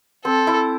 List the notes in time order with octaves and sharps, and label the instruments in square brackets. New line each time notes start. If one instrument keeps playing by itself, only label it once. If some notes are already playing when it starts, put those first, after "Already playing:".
[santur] C4 [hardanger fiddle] A4
[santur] E4